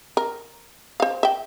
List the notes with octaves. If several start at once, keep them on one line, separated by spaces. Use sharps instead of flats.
A#4
C5 F5
E5 G5